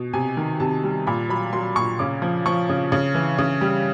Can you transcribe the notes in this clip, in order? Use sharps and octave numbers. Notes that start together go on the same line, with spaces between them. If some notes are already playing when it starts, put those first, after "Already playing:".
Already playing: B2
C3 G#5
D#3
C3 A5
G3
A#2 B5
F#3 B5
F#3 C6
A#2 C#6
C#3 D6
F3
F3 C#6
C#3
C#3
E3
C#3
G3